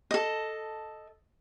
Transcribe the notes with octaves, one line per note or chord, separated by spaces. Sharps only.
A4 D#5